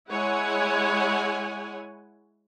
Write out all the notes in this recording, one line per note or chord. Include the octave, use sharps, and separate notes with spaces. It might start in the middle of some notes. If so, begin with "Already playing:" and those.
G#3 E4 C#5 F#5 G#5